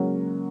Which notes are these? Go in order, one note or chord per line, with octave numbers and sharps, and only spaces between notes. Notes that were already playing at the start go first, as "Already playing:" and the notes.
Already playing: C#3 F#3 G#3 A#3 C#4 A#4